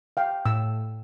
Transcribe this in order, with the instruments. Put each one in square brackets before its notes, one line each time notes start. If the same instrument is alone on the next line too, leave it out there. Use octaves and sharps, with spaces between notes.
[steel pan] F5 G5
[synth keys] A2 [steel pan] E6